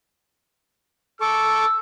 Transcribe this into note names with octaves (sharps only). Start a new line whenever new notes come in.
A4 C#6 D6 E6